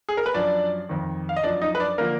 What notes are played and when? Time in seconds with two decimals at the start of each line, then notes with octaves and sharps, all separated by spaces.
0.09 G#4
0.17 A#4
0.26 B4
0.34 F#2 F3 D4 D5
0.89 F2 D#3
1.29 F5
1.36 D#5
1.43 F#2 F3 D4 D5
1.62 D#4 D#5
1.75 B4
1.80 D4 D5
1.98 D3 F3 A#3 A#4